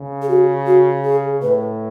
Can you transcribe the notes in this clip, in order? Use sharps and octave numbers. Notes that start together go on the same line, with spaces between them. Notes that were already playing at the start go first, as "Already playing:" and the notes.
Already playing: C#3
G#4
F#4
F#4
G#4
A2 B4